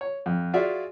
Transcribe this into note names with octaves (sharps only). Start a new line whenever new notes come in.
C#5
F2
F4 F#4 G#4 D5 E5 F5